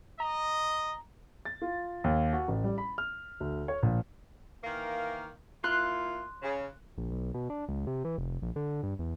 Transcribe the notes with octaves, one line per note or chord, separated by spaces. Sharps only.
D#5 A#5
A6
F4
D#2
F#4
A1
G3
B5
F6
D2
C#5
A#1
D#3 E3 A#3
A#3 E4 F4 C6 F#6
C#3
A#1
B1
B2
D4
C#2
C3
E3
F1
A#1
D3
G2
E2